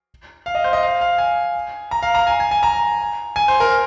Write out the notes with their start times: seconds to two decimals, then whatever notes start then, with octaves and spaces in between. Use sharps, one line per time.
0.46 F5
0.55 D#5
0.64 C5
0.73 D#5
0.83 F5
1.01 F5
1.18 G#5
1.91 A#5
2.03 F5
2.15 A#5
2.27 G#5
2.40 G#5
2.51 G#5
2.63 A#5
3.36 G#5
3.48 C5
3.60 A#4